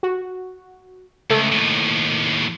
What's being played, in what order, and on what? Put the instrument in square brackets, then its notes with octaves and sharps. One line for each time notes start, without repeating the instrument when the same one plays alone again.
[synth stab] F#4
[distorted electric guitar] C#2 [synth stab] A3
[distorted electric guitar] D#2 A2